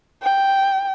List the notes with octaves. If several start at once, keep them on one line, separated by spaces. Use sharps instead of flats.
G5